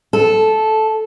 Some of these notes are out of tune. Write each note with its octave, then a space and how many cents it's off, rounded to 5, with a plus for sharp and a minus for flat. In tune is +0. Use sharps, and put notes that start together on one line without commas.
A4 -10